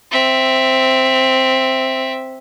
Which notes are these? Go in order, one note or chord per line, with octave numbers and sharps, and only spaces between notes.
C4 E5